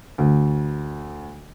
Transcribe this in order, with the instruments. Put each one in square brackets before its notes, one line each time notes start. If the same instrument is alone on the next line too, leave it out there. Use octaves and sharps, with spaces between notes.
[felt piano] D2